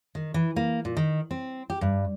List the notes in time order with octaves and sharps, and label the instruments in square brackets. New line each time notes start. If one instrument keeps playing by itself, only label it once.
[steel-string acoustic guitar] D#3
E3
A#3
A#2
D#3
C4
G4
G2